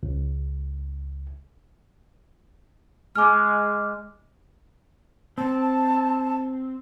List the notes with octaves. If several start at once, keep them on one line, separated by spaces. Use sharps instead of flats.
C#2
G#3 D6 F6
C4 A5